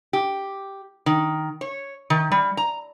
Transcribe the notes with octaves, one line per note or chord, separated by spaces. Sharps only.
G4
D#3
C#5
D#3
G3
A#5